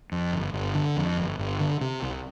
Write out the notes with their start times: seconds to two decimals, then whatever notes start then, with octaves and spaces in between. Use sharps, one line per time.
0.12 F2
0.33 G1
0.54 G1
0.75 D3
0.97 F2
1.18 G1
1.39 G1
1.60 D3
1.81 C3
2.02 C2